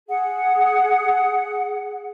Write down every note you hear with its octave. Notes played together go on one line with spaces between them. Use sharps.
G#4 F#5